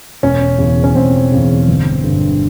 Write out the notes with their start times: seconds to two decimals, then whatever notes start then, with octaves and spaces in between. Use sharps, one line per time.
0.23 E1 C#4
0.59 E2 C#3
0.84 C#4
0.95 E1 C4
1.32 E2 C#3
1.68 G1
2.04 G2 D3